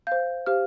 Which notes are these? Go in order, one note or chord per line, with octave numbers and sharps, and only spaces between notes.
C5 F5 G6
G4 C5 F5 F6